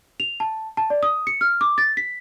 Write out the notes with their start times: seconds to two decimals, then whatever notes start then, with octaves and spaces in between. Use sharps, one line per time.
0.20 F7
0.40 A5
0.77 A5
0.90 D5
1.03 D#6
1.27 C#7
1.41 F6
1.61 D6
1.78 A6
1.97 B6